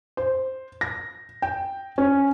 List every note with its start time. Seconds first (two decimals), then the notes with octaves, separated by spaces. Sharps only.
0.17 C5
0.81 A#6
1.42 G5
1.98 C#4